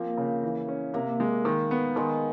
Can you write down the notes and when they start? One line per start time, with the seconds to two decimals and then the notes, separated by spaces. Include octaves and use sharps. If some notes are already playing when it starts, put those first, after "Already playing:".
Already playing: F3 A#3 C4
0.17 C#3
0.43 E3
0.68 C#4
0.94 C3 A#3
1.20 G#3
1.45 D#3
1.71 B3
1.96 D#3 G#3